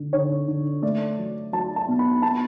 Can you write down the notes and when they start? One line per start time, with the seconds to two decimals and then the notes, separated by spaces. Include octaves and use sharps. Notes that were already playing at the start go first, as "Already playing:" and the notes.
Already playing: D3
0.13 D3 C#5
0.48 D3
0.82 A3 D5
1.18 F#3
1.53 F#3 A5
1.76 A5
1.88 B2
1.99 B5
2.22 B3 A5